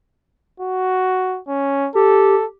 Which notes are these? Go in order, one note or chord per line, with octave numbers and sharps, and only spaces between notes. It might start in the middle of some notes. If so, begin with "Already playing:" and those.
F#4
C#4
G4 A4